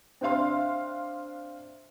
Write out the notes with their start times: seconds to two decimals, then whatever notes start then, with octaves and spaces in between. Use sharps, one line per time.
0.21 C4 D4 C5 E5 F5 C6